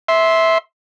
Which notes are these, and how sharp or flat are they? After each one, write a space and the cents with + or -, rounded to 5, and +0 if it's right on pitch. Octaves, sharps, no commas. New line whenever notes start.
E5 -10 C6 +0